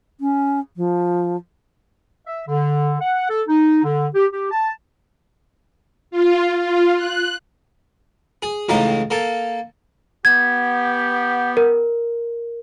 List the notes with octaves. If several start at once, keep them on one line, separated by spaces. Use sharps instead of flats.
C#4
F3
E5
D3
F#5
A4
D#4
D3
G4
G4
A5
F4
F4
F#6
G#4
C#2 A2 E3 D#4 F5 A#5
A#3 A4
B3 G4 G#6
A#4